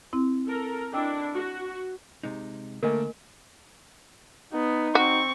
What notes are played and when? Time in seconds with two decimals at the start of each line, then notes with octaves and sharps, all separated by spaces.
0.13 C4 E4
0.46 A4 A#4
0.93 D4 E4 D#5 G5 E6
1.35 F#4
2.23 C3 G#3 D#4
2.83 D3 A3 A#3 A#4 D#5 G#5
4.53 B3 D#4
4.95 C4 F#4 C#6